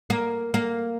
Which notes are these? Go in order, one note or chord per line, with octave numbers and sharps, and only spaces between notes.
A#3
A#3